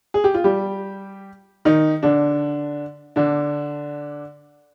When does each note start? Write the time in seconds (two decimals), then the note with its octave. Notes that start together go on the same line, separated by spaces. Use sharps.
0.14 G#4
0.24 G4
0.34 F4
0.44 G3 G4
1.65 D#3 D#4
2.03 D3 D4
3.16 D3 D4